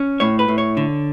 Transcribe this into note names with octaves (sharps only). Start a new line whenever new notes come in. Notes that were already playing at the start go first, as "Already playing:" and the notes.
Already playing: C#4
A2 C#5
B4
A2
C#5
D3